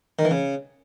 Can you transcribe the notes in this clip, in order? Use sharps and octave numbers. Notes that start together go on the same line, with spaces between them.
D#3
E3
C#3